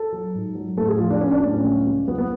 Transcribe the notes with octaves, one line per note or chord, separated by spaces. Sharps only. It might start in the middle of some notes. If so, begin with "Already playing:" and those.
Already playing: A4
F#3
G#2
F#3
A2 A4
G#4
F3 F4
D4
B3 C#4
D4
A2 D4
C#4
C#2
C#2
C#2 B3
B3